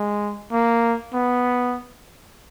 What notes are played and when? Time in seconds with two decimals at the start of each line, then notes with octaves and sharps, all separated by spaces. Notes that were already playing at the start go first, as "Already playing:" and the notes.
Already playing: G#3
0.52 A#3
1.13 B3